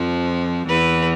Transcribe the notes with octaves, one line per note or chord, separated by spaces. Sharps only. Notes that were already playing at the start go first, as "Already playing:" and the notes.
Already playing: F2 F3
E2 E3 B4